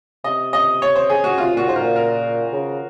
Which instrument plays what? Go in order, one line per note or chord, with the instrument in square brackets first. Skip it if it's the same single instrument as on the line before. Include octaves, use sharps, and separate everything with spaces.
[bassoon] C3 [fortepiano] D#5
[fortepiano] D#5
C#5
C5
G#4
F#4
[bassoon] C3 [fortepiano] F4
[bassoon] A#2 [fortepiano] F#4
[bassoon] G#2 [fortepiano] C5
[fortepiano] A#4
[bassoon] A#2
[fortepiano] A#4
[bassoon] C#3